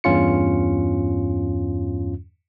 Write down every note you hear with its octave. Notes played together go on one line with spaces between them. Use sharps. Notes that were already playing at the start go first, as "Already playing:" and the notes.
E2 G2 C#4 F4 C#7